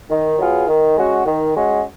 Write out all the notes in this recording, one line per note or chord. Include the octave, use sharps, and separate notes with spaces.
D#3
F#3 B3 F4 G#4
D#3
G#3 C#4 F#4
D#3
G#3 C#4 F#4